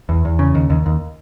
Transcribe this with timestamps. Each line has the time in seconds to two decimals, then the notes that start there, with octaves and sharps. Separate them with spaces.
0.09 E2
0.25 E2
0.39 C#3
0.55 D#2
0.70 D#2
0.86 D#2